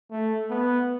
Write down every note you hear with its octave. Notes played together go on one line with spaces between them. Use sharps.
A3
B3